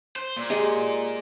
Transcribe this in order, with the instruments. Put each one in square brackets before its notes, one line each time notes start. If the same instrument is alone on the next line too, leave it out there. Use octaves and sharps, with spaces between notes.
[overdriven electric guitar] C5
A#2
[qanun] G#3 G4 G#4